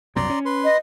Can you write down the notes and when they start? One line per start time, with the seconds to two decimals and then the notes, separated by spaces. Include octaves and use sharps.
0.16 C2 F#2 B2 D5 A#5 C6
0.30 C#4
0.45 B4 C6
0.64 D#5